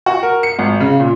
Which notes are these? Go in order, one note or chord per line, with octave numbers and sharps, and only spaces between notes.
F#4
A#4
C#7
G#1
C#3
A#2